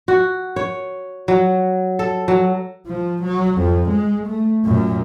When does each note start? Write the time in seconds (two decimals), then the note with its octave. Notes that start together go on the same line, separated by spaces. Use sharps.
0.08 F#4
0.56 C#5
1.28 F#3
1.99 A4
2.28 F#3
2.86 F3
3.23 F#3
3.59 F2
3.90 G#3
4.27 A3
4.65 F#2 A#2